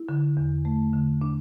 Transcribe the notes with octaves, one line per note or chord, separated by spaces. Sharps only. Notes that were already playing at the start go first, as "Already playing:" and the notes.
Already playing: E4
D3
E2
A3
D3
D4